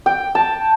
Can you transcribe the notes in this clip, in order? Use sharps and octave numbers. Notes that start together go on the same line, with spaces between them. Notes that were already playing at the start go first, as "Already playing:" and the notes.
G5
A5